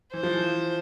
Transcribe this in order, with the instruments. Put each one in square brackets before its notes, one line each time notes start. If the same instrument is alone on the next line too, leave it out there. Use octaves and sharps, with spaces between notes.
[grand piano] E3 [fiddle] C5
[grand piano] F3
E3